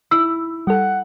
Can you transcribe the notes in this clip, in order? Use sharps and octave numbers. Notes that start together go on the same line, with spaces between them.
E4 E6
G3 A4 F#5